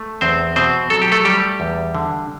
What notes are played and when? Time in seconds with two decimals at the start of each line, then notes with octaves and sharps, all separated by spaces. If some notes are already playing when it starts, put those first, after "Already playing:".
Already playing: A3
0.21 E2 C4 C5
0.56 B2 C4 C5
0.90 F#3 A4
1.02 G4
1.12 A3 A4
1.25 G3 A3 G4
1.60 E2
1.95 D3